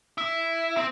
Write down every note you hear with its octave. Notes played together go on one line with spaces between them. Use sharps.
E4
C4